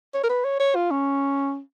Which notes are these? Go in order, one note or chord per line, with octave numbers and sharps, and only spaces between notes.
C#5
A#4
B4
C#5
C#5
F4
C#4